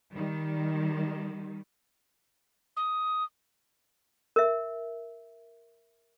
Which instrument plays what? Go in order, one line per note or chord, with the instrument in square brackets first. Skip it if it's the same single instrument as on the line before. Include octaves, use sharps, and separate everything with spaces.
[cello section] D#3 G3
[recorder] D#6
[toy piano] A#4 E5